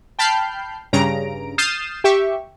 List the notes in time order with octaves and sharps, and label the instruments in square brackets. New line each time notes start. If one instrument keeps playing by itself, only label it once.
[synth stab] G5 A5 B5 F6 G6 C7
G2 C#3 A#5 D7
D#6 F6 G6 A6 C7 E7
G4 E5 C#6